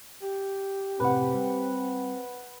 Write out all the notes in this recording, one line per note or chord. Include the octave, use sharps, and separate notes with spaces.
G4
F#2 A2 C3 C4 B4 F#5
G3